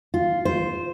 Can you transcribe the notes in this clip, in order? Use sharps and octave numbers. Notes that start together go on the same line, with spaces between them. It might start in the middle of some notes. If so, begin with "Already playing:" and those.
F4
C5